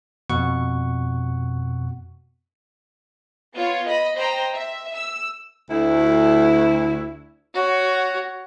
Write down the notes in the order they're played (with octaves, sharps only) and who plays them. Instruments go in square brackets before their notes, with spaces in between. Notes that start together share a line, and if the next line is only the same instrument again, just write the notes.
[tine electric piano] F2 B2 F#5 C#6
[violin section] B3 F4 C#5
D#5 B5
C5 D#5 G5 A#5
E5
E6
[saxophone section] D2 E4
[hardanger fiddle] F#4 C#5